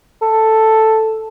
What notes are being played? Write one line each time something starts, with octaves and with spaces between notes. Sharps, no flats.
A4